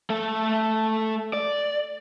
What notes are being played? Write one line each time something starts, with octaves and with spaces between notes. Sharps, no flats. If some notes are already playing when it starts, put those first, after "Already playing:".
A3 A4
D5